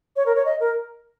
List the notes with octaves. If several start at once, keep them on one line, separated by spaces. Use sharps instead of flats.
C#5
A#4
C#5
D#5
A#4